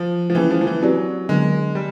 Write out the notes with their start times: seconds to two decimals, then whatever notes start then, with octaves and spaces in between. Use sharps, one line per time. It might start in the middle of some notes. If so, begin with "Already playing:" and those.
Already playing: F3
0.30 F3
0.35 E3 A#3 C#4 E4 G#4
0.51 F3
0.61 F3
0.67 E3
0.81 F#3 C4 E4 G4 B4 D5
1.28 D3 F#3 G#3 B3 D4
1.75 G3